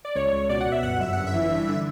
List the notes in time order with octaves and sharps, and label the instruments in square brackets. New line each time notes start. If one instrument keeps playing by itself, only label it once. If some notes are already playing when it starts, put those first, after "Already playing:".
[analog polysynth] D5
C#2 C#5
C#2
B2 D5
F#5
B2
E5
G1 F#5
F#2 E5
G1 F#5
E5
E3
G2
D3